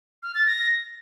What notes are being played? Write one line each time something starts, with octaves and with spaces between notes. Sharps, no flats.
F6
A6
A#6